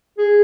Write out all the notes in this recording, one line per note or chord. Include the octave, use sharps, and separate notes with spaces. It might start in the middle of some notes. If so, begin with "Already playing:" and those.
G#4